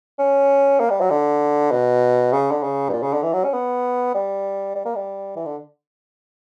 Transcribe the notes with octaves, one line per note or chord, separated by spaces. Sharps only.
C#4
A#3
G3
F#3
D3
B2
C#3
D3
C#3
G2
A#2
C#3
D3
E3
F#3
C#4
B3
G3
G3
A#3
G3
E3
D3